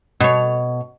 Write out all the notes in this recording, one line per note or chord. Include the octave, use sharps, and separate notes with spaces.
B2 C#5